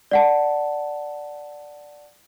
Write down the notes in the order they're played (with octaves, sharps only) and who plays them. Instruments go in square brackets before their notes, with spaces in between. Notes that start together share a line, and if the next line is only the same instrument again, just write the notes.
[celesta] D5 F#5 A5